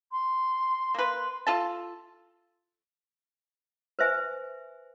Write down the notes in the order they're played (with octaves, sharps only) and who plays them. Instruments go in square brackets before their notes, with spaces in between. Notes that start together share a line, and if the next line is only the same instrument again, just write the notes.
[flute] C6
[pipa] A#3 B4
F4 A4 A5
[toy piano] B4 C5 E5 G#5